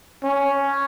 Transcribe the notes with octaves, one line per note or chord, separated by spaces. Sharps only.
C#4